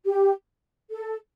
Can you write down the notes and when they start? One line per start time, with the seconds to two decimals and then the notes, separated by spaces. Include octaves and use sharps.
0.06 G4
0.90 A4